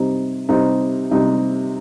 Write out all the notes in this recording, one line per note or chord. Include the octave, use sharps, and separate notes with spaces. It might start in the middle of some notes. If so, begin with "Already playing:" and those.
Already playing: C3 G3 C4 D#4
C3 G3 C4 D#4
C3 G3 C4 D#4